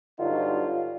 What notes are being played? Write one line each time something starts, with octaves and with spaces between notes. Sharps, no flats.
G2 D3 F#3 D#4 F4